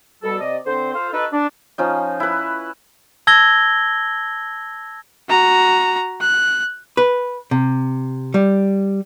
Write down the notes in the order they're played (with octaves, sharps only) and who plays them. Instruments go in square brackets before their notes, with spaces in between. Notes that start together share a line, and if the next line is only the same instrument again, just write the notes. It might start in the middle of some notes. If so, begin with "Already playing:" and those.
[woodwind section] B2 G3 A4
C3 D5 D#5
D3 C4 C5
F4 A4 C5 F5
D#4 F#4 A4 B4
D4
[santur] F3 C#4 D#4
E4 B4
[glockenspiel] A5 E6 G#6 A#6 G7
[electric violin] F#4 A#5
F#6
[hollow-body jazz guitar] B4
C3
G3